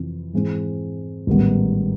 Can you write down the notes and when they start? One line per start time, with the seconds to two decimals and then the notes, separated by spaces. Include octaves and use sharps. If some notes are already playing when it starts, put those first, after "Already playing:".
Already playing: F2 C3 E3
0.33 G#2 E3 G#3 C4
1.27 A1 G#2 D#3 G3 B3